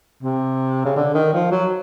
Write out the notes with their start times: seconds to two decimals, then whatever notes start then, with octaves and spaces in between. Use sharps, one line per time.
0.23 C3
0.85 C#3
0.96 D3
1.15 D#3
1.33 F3
1.51 F#3